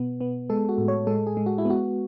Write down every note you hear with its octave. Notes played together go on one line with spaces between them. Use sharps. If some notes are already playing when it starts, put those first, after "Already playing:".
Already playing: B2 B3
B3
G#3 A4
F#4
A2
C#5
G#3 A4
G#4
G#3
F#4
E4
B3
F#4